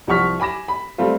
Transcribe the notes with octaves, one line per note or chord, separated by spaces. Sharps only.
C2 F3 F#5 C#6 F6 B6
G#5 B5 D6 A#6 E7
B5
G3 A3 C4 F4